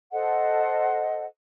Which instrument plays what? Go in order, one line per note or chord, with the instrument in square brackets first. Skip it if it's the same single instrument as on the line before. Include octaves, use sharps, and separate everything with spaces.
[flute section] A4 C5 D#5 F#5